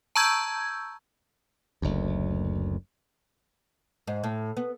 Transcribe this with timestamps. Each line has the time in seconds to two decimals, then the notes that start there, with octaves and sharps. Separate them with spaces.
0.15 A5 A#5 C#6 E6 G6 G#6
1.82 F#1 D2
4.07 G#2
4.24 A2
4.57 B3